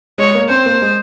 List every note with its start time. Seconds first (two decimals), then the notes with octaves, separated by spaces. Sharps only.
0.18 G#3 C#5
0.35 A#3
0.49 C4 C5
0.66 A#3
0.82 G#3